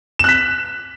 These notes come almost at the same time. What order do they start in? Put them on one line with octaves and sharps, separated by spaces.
E7 F#6 B6